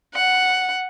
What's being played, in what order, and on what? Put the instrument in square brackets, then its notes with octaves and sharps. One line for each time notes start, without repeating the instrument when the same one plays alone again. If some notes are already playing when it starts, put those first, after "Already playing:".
[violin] F#5